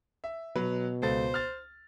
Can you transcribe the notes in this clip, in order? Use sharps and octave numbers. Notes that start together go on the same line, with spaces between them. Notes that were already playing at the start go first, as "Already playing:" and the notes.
E5
B2 F#3 B4
C#2 A4 C5 A6
F6 A6